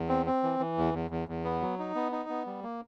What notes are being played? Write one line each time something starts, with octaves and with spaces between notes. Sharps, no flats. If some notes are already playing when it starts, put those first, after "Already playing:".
Already playing: E2
C4
C4
E3
E3
E2
E2
E2
E2
B3
F#3
D#4
B3
D#4
B3
G3
A#3